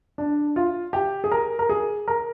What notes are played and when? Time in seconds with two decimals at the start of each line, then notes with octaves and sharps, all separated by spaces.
0.18 D4
0.56 F4
0.93 G4
1.24 G#4
1.32 A#4
1.59 A#4
1.69 G#4
2.08 A#4